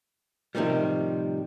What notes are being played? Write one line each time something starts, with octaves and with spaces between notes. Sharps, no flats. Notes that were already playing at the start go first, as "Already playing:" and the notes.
A2 C3 D#3 F3 G3